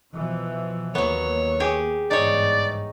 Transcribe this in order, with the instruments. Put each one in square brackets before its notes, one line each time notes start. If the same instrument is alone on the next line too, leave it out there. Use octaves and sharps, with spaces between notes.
[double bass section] B2 E3 F3
[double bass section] D#2 A#3 [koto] F#3 B3 [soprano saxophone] C#5
[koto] G4 G#4
[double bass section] G1 G#2 E3 [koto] D#4 C#5 [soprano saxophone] D5